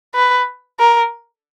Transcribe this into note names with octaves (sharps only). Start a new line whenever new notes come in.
B4
A#4